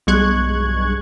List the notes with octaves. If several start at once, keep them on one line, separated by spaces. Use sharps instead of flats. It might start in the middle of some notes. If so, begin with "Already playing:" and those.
B1 G2 G#3 C#6 F#6 G#6